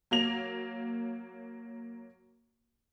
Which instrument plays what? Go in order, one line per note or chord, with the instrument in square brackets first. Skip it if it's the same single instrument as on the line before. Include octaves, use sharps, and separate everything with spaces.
[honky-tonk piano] F#3 A#3 F7